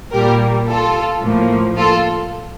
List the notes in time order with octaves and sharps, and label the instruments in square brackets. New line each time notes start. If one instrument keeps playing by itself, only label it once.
[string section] A#2 G3 A#3 G4 A#4
F4 A4
A2 F3 A#3
F4 A4